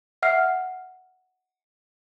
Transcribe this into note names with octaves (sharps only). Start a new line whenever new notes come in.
E5 F#5 F6 C7